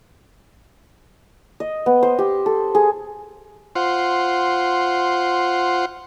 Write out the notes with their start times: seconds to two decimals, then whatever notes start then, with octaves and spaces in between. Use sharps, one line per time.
1.60 D#5
1.86 B3
2.03 C5
2.18 G4
2.46 A4
2.75 G#4
3.75 F4 C5 F#5